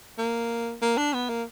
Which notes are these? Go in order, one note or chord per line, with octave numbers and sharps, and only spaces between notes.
A#3
A#3
D4
B3
A#3